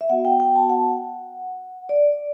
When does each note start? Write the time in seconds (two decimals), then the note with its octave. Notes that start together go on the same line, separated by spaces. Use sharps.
0.01 E5
0.10 B3 F#4 F#5
0.25 G5
0.40 G5
0.56 A5
0.69 F#5
1.89 D5